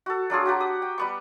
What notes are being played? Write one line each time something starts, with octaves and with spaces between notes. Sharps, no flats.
F#4 A4
F#3 D4 F4 G#4
F#4 G4 F#5 A#5
D#6
G5
G3 B3 C#6